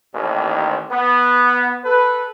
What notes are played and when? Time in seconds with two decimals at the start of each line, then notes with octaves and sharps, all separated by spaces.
0.13 A1 D#2
0.90 B3
1.84 A4 B4